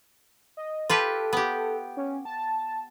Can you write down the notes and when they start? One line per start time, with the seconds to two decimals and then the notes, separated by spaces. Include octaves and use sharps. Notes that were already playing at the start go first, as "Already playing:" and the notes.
0.57 D#5
0.90 F4 G4 A4 B4
1.33 B3 G4
1.97 C#4
2.25 A5